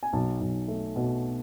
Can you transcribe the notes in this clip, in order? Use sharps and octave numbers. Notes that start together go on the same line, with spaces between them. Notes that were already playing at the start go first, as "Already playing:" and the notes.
G#5
B1 A5
B1
A3
B2